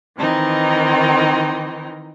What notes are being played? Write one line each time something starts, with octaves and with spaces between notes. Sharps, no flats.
D#3 E3 C4 D#4